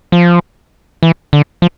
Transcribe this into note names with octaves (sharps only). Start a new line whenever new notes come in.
F3
E3
D3
F3